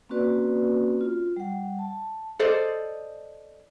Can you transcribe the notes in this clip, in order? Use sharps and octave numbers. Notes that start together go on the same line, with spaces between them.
A#3 C4 C#4 F#4 B4 D5
F4
G3 F#5
A5
A4 C5 D5 D#5